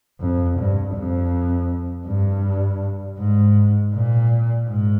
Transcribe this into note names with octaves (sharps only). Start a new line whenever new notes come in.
F2
G2
F2
G2
G#2
A#2
G#2